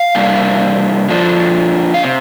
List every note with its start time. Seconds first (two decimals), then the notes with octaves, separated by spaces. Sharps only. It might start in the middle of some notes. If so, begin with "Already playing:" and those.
Already playing: F5
0.15 C3 G3 A#3 D4
1.09 D3 F3 D4
1.94 F5
2.03 C3